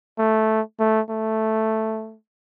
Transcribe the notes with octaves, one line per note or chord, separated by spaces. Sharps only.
A3
A3
A3